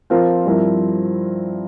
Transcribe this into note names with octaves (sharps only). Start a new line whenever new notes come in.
F3 C4 F4 A#4
G2 F3 C4 E4 A#4